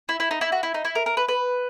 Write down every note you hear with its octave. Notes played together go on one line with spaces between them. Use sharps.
E4
E4
D#4
E4
F#4
E4
D#4
E4
A#4
A#4
B4
B4